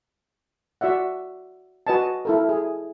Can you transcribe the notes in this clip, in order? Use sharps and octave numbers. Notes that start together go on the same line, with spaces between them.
F#4 D5 E5 F#5
F#4 B4 D#5 G#5 A5
E4 A4 A#4
G#4